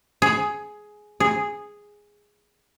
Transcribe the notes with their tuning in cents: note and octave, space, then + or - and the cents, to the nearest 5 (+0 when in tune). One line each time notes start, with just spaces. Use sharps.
G#4 +10
G#4 -5